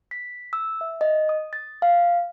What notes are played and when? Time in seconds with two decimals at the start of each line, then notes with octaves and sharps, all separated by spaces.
0.11 B6
0.53 E6
0.81 E5
1.01 D#5
1.29 D#6
1.53 A6
1.82 F5